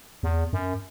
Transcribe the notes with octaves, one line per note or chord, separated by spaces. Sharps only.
E2
F#2